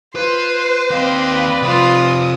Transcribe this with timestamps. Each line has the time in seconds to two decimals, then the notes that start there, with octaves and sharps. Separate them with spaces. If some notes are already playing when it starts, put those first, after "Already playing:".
0.16 F4 B4 C5
0.90 D#2 C4 B4 D5 D#5 F5
1.62 C3 F3 F4 C5 D#6